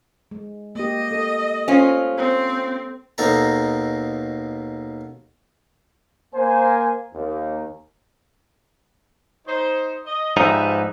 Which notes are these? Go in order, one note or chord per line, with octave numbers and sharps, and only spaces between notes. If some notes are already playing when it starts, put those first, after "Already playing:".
G#3
A#3 G4 D#5
A4
C#4 F4 A4 C5
C4 C5
D#2 B2 D#4 A4 A#5
A#3 C5 G#5
D#2
D#4 C5
D#5
G#2 F3 G3 D#4 B4 E5